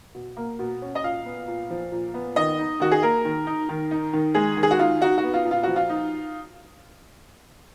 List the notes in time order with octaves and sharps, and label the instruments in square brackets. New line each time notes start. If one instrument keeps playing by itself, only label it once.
[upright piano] B2
A#3
B2
C#4
D#5
A#2 F5
B3
A#2
F3
A#2
B3
D#3 D#5
D#4
D#3 F#4
G#4
A#3 A#4
D#3
D#4
D#3
D#4
D#3
G#3 G#4
D#3
G#4
F#4
D#4 F4
D#4 F#4
F#4
B3
F4
A#2
F4
F3 F#4
F4
D#4